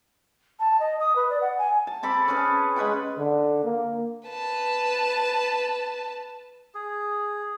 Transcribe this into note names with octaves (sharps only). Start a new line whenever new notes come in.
A5
D#5
D#6
B4
D5
F#5
G#5
A5
C4 A4 B5 D6
C#4 G#4 A4 B4
G#3 B4 F#5 G5
D3
A#3
B4 A5
G#4